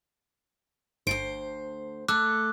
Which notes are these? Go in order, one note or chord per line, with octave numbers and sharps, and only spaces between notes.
G1 D2 G#2 C5 D7
A3 A4 D6 E6 F#6